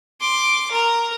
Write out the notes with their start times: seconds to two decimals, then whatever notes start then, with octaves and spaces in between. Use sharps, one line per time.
0.21 C6 D6
0.71 A#4 A#5